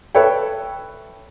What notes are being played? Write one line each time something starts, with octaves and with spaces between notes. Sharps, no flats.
A4 B4 C#5 E5 G5